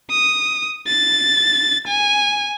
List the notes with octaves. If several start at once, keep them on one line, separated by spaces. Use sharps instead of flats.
D#6
A6
G#5